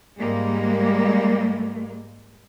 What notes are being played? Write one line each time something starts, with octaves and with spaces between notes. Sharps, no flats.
G#2 G3 G#3 A#3